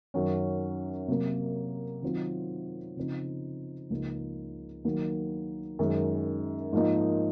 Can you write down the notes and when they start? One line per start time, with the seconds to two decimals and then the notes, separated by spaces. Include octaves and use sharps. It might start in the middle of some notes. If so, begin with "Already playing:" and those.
0.14 F#2 D#3 F#3 C#4
1.08 C3 F#3 A#3
2.03 D#3 F#3 C4 F4
2.97 C#3 F3 C4 D#4
3.90 C#2 C#3 F3 A#3 D#4
4.85 D#3 F#3 A#3
5.79 F#2 D#3 G#3
6.73 G#2 F3 A#3 D#4